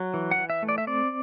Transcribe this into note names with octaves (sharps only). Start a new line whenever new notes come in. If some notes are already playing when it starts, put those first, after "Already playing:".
Already playing: F#3
E3
F#5
E3
E5
A3
D5
E5
C4 D5